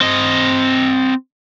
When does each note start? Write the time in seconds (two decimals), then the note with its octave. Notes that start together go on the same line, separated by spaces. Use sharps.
0.01 C4 D#5